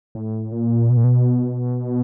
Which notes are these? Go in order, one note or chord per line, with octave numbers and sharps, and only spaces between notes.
A2
A#2
B2
A#2
B2